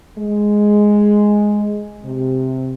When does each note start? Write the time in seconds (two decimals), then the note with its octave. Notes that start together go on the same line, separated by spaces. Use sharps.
0.18 G#3
2.04 C3